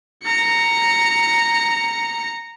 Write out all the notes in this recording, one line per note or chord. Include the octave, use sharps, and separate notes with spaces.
A#5 C#7